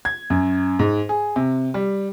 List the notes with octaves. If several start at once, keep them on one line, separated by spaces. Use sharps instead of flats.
G#6
F#2
G#2
G#4
C3
G3